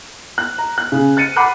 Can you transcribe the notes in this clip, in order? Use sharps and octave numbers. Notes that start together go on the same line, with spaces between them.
F#6
A#5
F#6
C#3
F#6 A6 C#7 D#7
F#5 B5 D6 F#6 C7 D#7